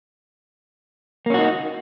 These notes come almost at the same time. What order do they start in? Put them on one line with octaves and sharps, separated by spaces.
A#3 C#4 F#4 D#4